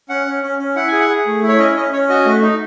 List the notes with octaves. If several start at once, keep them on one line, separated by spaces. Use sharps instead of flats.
C#4 F#5
C#4
C#4
C#4
E4 F#5
G#4 G#5
F#5
G#4
A3
E4
C#5
C#4 D#5
C#4 D#5
C#4 C#5
F#4 D#5
A3
D#4